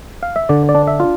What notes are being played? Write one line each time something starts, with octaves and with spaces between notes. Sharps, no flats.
F5
E5
D3 D5
D5
D4
E5
F4